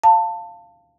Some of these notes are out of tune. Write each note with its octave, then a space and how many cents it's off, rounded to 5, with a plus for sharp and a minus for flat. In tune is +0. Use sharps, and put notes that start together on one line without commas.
F5 +0 A5 +20